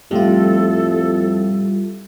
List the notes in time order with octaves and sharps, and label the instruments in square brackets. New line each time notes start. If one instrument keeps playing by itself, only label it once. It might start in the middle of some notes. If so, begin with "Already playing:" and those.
[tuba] F2 [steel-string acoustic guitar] A2 [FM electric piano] G3 F4 [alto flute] A4